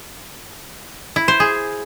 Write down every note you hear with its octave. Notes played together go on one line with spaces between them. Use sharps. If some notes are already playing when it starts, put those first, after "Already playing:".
E4
C5
G#4